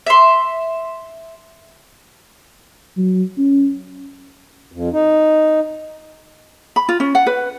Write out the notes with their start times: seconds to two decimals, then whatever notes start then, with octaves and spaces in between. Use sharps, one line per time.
0.06 E5 C6
2.97 F#3
3.38 C#4
4.72 F2
4.92 D#4
6.76 B5
6.89 F4
7.00 C#4
7.15 F#5
7.27 B4